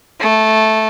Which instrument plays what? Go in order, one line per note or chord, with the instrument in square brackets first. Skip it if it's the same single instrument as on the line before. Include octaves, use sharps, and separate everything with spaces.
[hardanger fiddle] A3